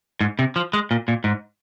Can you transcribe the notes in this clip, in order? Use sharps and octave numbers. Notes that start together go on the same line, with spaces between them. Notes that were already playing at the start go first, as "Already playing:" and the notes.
G#2
C3
F3
G#3
A#2
A#2
G#2